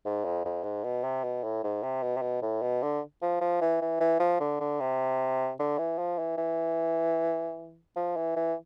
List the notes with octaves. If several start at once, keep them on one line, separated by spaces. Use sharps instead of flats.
G#2
F2
F2
G#2
B2
C3
B2
A2
G#2
C3
B2
C3
B2
A2
B2
D3
F3
F3
E3
E3
E3
F3
D3
D3
C3
D3
E3
F3
E3
E3
F3
E3
E3